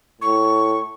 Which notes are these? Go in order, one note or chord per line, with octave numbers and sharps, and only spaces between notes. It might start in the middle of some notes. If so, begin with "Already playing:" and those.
A2 C#6